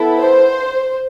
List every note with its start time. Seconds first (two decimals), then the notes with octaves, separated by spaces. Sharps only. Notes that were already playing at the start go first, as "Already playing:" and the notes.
Already playing: B3 E4 A4
0.20 C5